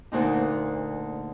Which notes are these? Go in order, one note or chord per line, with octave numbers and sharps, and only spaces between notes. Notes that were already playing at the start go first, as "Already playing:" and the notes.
D2 A#2 D#4